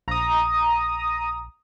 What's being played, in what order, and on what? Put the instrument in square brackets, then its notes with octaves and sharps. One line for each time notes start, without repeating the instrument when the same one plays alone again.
[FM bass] A#1 [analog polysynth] A#5 D#6